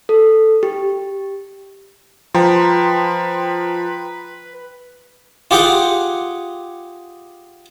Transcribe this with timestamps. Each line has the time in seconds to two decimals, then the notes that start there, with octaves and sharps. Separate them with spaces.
0.09 A4
0.63 G4
2.34 F3 B4 G5 A#5 C6
5.51 F4 G4 G#4 F#5 G5